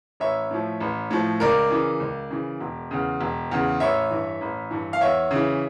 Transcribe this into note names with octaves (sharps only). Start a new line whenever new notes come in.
A1 C#5 E5
A2 F3
A1
A2 F3
C#2 A#4 D5
C#3 E3
C#2
C#3 E3
E1
E2 C#3
E1
E2 C#3
A1 C#5 E5
G2 E3
A1
G2 E3
F5
E2 C#5 E5
C#3 E3